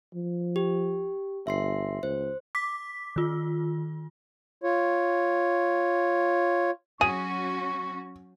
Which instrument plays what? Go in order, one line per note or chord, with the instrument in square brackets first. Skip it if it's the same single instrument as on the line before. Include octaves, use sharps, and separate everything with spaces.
[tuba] F3
[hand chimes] G4
[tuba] G1 [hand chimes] E5 C6 C7
[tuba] C#2 [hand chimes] C5
[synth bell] D6 B6
D#3 F4
[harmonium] F4 C#5
[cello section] F#3 C#4 F#4 [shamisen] G#4 [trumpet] C#6 [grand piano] D#7